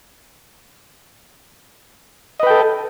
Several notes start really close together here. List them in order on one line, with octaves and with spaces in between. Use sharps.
D#5 B4 G5 A4